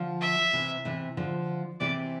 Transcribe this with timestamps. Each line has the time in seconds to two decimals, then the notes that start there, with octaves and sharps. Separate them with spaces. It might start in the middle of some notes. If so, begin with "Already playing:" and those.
Already playing: D3 F3
0.21 E5
0.53 C3 E3
0.85 C3 E3
1.17 D3 F3
1.80 C3 E3 D5